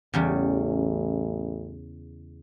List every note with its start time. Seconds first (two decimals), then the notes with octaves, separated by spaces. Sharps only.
0.14 A1 E2 C#3 G3